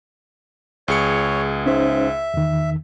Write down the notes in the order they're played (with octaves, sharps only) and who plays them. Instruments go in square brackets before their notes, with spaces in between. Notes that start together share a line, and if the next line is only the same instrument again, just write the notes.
[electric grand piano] C#2 G#4 C#7 [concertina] C#5
[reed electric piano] C#4 D#4 C5 [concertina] E5
[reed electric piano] E2 D#3